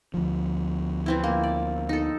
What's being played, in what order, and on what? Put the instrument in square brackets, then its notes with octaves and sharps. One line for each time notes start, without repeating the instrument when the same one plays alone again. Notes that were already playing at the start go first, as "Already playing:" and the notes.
[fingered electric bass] D2 F3
[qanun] E3 C4 E4
A#3
D5
D#4 A4